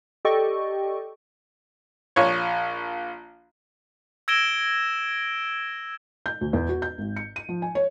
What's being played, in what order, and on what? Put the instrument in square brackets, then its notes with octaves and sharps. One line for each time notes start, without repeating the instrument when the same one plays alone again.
[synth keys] G4 A4 D5 D#5 G5 C#6
[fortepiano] A#1 C#5
[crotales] E6 G#6 A#6 D7 E7 G7
[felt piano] G6
D2
E2
F#4
G6
G#1
C#7
D#7
F3
G#5
C#5